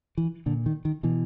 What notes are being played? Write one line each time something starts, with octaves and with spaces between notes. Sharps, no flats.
E3
A#2 D3
D#3
D#3
B2 E3